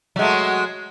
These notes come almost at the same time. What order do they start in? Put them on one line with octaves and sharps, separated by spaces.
F#3 G#3 A3